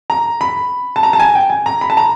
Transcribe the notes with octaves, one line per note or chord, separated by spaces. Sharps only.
A#5
B5
A5
A#5
A5
G#5
G5
G#5
A#5
B5
A5
A#5